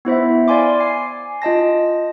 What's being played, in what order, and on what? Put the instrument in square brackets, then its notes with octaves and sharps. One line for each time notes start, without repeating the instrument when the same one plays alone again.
[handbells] B3 E4 C5 E5
D5 F5 G#5 C6 D6
G#5 C7
F4 D#5 A5 A#6